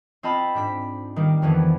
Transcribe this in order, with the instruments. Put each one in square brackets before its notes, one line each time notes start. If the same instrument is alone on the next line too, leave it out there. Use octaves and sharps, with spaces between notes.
[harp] C4 F4 D#5 A5 B5
G#2 D4 B6
D#3 G3 A#3
F2 D3 E3 B3